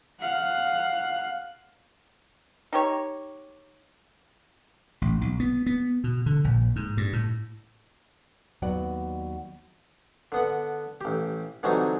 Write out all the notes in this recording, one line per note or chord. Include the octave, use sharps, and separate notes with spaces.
F5 F#5
D#4 G4 C#5
A1
B1
B3
B3
B2
D3
A#1
G#2
G2
A2
D#2 F#3 B3 D5 F#5
D3 B3 F#5
A1 G4
D3 E3 F#3 G3 C4 D#4